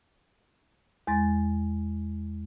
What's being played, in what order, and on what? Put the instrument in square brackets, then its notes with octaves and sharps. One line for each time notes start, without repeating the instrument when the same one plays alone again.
[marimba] E2 G#3 C6 A6 A#6